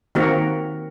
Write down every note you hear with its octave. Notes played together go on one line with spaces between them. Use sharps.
D#3 A#3 C4 F#4 A#4